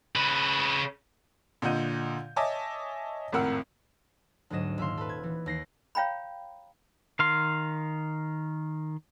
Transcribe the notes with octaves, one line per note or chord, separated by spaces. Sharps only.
C#3 B4
A#2 D3 D#5 F#5 G6 D#7
C#5 D#5 E5 G#5 A5 D6
G#1 F2 A2 A#4 F#5 E6
D2 G#2 F#3 D#5 E7
D#1 E5 F5 C6
A4 B4
G#6
E3
D#2 A#6 C7
C#5 F5 G5 A#5 B5
D#3 F5 C6